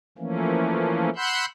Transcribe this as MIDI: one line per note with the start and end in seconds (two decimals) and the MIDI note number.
0.18 1.10 52
0.18 1.10 53
0.18 1.10 57
0.18 1.10 58
0.18 1.10 61
1.16 1.45 78
1.16 1.45 83
1.16 1.45 84
1.16 1.45 88
1.16 1.45 90
1.16 1.45 91